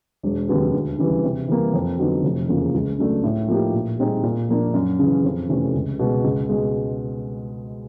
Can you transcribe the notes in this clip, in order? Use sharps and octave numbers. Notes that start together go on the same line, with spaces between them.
E1
D#2 C#3 F#3 B3
D2
C#3 E3 G3
C3
E3 G3 A#3
F2
D3 F#3 B3 D#4
F1
E2 C#3 F3 A#3
C#2
C#3 F#3 A3 D4
A2
F3 A#3 D#4 G4
A#2
G3 C4 D#4 G#4
A#2
F3 A#3 D4
F#2
C#3 E3
F2
C3 E3 A3 C#4
C#2
B2 G#3
C#2
B2 G#3